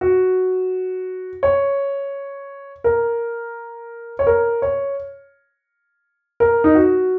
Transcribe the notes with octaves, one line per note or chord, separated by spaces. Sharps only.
F#4
C#5
A#4
C#5
A#4
C#5
A#4
D#4
F#4